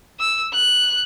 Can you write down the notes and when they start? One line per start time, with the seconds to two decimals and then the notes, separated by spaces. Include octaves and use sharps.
0.20 E6
0.53 F#6